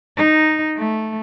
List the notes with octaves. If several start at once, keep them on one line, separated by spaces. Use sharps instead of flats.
D#4
A3